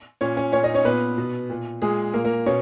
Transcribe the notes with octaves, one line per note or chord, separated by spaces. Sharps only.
A#2 C#4 C#5
C#4 C#5
A#2 C#4 C#5
D#4 D#5
C#4 C#5
A#2 B3 B4
B2
A#2
A#2 G#3 G#4
A#2 A#3 A#4
A#3 A#4
B2 C#4 C#5